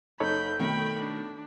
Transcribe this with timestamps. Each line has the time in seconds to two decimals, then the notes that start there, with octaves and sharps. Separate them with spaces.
0.20 F#1 D#4 A4 C#5 B5 G6
0.59 B2 D#3 A3 G5 B5
1.00 D4